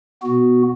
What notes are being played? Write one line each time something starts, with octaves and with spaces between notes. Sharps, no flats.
B2 B3 F#4